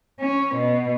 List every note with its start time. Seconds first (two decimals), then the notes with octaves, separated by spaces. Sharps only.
0.19 C#4
0.54 B2